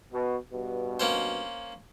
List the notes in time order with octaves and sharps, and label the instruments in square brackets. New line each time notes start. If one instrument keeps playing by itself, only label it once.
[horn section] B2
G2 B2
[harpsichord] A#3 C#4 C5